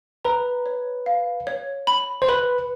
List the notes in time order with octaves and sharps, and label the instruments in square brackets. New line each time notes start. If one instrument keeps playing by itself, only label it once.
[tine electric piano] B4 [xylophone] A#5
[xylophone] C#5
F5
C#5
B5
[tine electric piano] C5
[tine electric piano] B4 [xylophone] B5